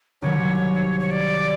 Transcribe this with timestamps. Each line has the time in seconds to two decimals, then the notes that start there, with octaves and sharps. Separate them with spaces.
0.22 C2 C3 D#3 F#3 C#5
1.00 C#5
1.11 D5